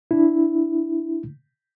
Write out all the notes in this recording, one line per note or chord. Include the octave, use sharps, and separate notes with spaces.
D4 E4